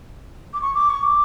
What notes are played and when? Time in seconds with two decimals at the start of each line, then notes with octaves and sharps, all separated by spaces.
0.53 D6
0.61 C#6
0.74 D6
0.89 C#6
1.03 D6